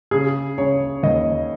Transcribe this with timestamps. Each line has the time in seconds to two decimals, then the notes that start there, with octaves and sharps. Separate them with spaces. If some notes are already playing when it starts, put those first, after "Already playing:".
0.11 C#3 G#4
0.58 C#3 C#5
1.03 D#2 D#5